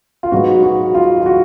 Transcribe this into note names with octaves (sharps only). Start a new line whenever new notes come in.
F4
G#2 F#3 B3 F#4
F#4
F4
F4
F#4